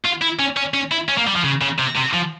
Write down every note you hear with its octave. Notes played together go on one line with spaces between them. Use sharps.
F4
E4
C#4
C#4
C#4
E4
C#4
A#3
G3
F3
C#3
C#3
C3
C3
F3